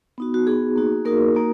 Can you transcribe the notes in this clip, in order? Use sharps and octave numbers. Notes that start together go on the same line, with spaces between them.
B3 D#4 F#4
F#4
B3 D#4 F#4 G#4
A#3 D#4 F#4
A#3 D#4 F#4 A#4
A#3 D#4 F#4